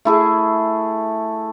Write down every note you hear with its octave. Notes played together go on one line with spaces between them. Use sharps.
A3 E4 G#4